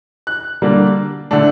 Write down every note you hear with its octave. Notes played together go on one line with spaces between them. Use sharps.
F#6
D3 G3 A#3 D4
D3 A3 D4